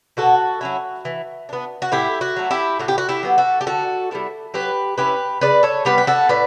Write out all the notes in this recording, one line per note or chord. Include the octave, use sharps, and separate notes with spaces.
B2 F#4 A4
F#3 C#4 E4
E3
B3 D4
F#4
A2 E4 G4
F#4
F#3 A3
E4 G4
A2 F#4
G4
F#4
E4 G4
F#3 B3 E4
F#4 A4
G4
D3 F#4 A4
G3 B3 E4
F#3 G4 B4
C#4 E4 G4 B4
C#3 B4 D5
A4 C#5
G3 B3 G4 B4
B4
F#4 A4
A2 B4 D5